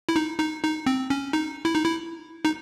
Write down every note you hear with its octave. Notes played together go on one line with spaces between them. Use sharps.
E4
D#4
D#4
D#4
C4
C#4
D#4
E4
D#4
E4
D#4